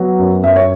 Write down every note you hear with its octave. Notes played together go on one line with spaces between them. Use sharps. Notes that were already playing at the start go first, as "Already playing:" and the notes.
Already playing: F#3 B3
F#2
F#2 E5
C#5